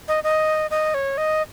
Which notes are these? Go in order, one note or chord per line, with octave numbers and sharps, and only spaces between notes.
D#5
D#5
D#5
C#5
D#5